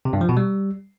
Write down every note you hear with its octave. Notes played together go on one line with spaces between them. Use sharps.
C3
G2
F3
B2
G3